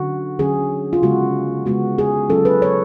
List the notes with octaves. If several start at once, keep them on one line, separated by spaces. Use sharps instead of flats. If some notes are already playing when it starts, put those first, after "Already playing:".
Already playing: D3 F#3 C#4 F#4
D3 F#3 C#4 G#4
F4
C#3 G#3 B3 F#4
C#3 G#3 B3 F#4
G#4
F#3 C#4 F4 A4
B4
C#5